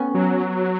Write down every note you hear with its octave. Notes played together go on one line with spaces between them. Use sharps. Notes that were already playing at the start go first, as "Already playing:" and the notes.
Already playing: B3 C#4
F#3